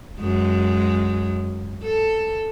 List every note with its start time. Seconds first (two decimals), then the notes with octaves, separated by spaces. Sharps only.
0.20 F#2 G#3
1.83 A4